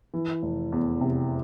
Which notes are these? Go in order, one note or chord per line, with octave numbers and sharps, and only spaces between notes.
E3
F1
E2
C3